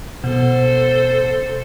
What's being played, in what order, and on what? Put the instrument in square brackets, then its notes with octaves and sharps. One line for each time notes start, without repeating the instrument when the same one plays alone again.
[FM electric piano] B2 [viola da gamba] A4 C5